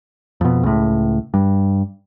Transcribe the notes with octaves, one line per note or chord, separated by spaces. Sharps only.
F2 B2
C#2 A2
G2